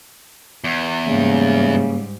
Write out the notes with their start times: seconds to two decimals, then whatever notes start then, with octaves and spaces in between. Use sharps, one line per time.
0.64 E2
1.06 G#2 C#3 G3 A#3